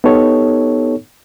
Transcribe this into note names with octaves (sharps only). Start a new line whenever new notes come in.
B3 D#4 G4 A4 C#5